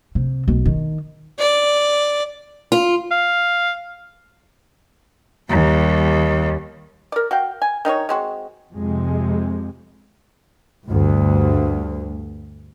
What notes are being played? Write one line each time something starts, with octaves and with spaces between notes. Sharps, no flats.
C3
B1
D#3
D5
F4
F5
D#2 G3
A#4 D5
F#4 F5 G5
G#5
D#3 D#4 F4 C#5
G#3 C4 F#4
F2 C3 G#3
D2 G2